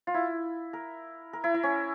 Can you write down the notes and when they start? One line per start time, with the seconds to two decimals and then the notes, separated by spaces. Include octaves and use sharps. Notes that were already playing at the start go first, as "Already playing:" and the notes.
0.07 F4
0.14 E4
0.73 A#4
1.33 A#4
1.44 E4
1.54 E4
1.63 C#4